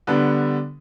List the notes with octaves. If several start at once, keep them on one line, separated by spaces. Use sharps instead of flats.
D3 G3 B3 D4